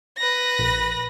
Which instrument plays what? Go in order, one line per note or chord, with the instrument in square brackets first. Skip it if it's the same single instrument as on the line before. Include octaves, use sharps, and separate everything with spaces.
[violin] B4 A#6
[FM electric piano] A#1